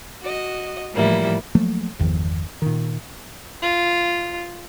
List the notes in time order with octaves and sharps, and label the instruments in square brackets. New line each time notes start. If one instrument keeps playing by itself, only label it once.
[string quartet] F#4 D#5
A2 E3 F3 G3 A#3 E4
[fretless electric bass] F3 F#3 A3 A#3
G1 E2 D#3 F3
A#2 D#3
[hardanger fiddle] F4